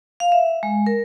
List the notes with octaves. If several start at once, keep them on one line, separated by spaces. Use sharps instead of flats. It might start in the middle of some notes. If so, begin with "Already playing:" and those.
F5
E5
G#3
A#4